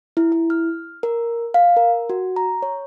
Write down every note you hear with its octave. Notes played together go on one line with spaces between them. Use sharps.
E4
E4
F6
A#4
F5
A#4
F#4
A#5
C#5